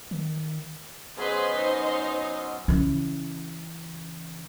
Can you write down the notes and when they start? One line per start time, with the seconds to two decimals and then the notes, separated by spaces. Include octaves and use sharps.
0.11 D#3
1.17 F#3 B3 C#4 G#4 B4 C5 D#5 C6
1.57 D#4
2.68 C#3 E3